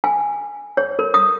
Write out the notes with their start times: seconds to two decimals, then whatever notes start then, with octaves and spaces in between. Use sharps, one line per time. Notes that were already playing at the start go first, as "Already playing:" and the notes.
0.04 G#5
0.77 C#5
0.99 A#4
1.14 D#6